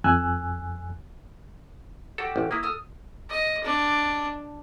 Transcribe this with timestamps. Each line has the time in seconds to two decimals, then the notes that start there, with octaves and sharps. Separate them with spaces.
0.04 F2 G#5 E6 F#6
2.18 F#4 G4 A4 D5
2.36 A1
2.51 A#3 E4 B4 D#6
2.63 A4 D#6 F6
3.30 D#5
3.64 D4